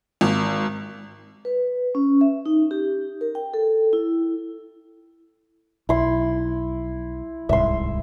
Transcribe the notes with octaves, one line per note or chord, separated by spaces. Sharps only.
G#1
B4
C#4
E5
D#4
G4
A#4
G5
A4
E4
B1 E4 C6
D1 C2 G#2 E5 C6